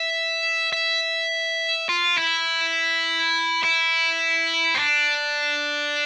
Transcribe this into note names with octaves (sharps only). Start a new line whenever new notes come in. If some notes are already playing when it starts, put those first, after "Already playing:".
Already playing: E5
E5
F4
E4
E4
C4
D4